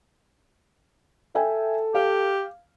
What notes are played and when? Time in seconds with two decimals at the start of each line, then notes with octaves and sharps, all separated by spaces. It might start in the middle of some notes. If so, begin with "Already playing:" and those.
1.35 A4 E5 G5 G#5
1.95 G4 F5